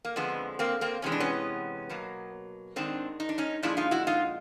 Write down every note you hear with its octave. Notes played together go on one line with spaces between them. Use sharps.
A#3
F2 D3 F3 G#3 B3
A#3 C4
A#3 C4
E2 C3 E3 G#3 C#4
D4
B3 C#4
B2 F#3 A#3
G#2 D#3 G#3 C4 D4
D#4
D4
C#4 D#4
A#2 F3 G#3 D4 E4
D#4 F4
E4 F#4
D#4 F4